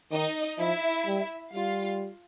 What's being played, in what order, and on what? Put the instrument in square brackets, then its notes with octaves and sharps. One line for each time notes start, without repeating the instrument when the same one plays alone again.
[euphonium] D#3 [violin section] D#4 D#5
[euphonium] F3 [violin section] E4 E5
[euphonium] G3
[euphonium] G3 [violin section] F4 F5